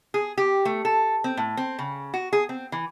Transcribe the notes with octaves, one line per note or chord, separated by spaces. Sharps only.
G#4
G4
A3
A4
C4
A2
C4
C#3
F#4
G#4
C4
E3